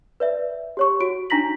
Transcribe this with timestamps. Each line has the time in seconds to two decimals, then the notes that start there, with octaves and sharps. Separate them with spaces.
0.20 B4 D5 E5
0.77 G4 C#5 C#6
1.00 F#4 D7
1.30 D4 D#4 A#5 A#6 B6 F#7